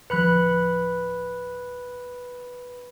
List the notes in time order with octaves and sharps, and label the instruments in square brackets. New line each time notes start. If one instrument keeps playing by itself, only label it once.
[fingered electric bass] D1 F3 [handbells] B4 B5 F#6